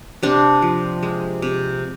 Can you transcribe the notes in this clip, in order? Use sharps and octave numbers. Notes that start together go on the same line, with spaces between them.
C3 D4
F3
G#3
C3